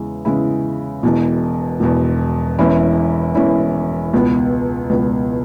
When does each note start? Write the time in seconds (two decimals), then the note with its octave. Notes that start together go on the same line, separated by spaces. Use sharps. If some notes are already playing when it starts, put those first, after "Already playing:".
Already playing: E2 C#3 G#3 E4
0.25 E2 C#3 G#3 E4
1.03 E1 E2 B2
1.80 E1 E2 B2
2.58 E1 E2 E3 C#4 E4
3.35 E1 E2 E3 C#4 E4
4.14 C#2 B2 B3
4.90 C#2 B2 B3